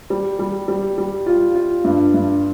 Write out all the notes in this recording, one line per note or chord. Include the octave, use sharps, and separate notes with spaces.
G3
G3
G3
G3
F4
F4
G2
G2